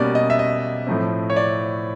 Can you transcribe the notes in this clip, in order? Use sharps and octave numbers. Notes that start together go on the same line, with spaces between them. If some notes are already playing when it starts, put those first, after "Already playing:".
Already playing: B2 G3 A#3 C#4 D5
D#5
E5
D#5
A2 F3 A3 C4
C#5
D5